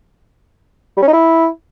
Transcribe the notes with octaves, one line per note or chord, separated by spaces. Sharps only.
G3
C#4
D#4
E4